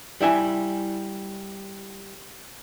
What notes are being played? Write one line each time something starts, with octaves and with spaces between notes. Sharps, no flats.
G3 E4 E5 G#5